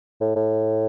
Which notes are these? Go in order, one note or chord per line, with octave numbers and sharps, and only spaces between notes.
A2
A2